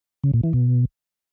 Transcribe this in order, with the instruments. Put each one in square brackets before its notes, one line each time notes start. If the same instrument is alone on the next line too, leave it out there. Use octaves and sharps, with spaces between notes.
[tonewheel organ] C#3
A#2
E3
B2